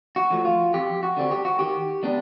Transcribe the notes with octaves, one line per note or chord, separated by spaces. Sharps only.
F#4
F3 A3
F4
F2 G4
F#4
D3 G3 C4
G4
F#4
D#3 G4
G3 B3 D4